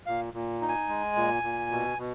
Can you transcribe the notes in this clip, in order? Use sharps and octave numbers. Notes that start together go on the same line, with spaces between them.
A#2 F5
A#2
D#4
G#5
G#3
A#2
A#2
B2
B2